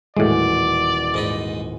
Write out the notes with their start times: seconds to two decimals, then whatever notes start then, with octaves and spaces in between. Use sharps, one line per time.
0.17 D#1 A2 E3 G#3 F#4 D5
1.14 G#2 D#4 B5